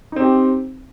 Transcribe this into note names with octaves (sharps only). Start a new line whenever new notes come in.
C4 D#4 G4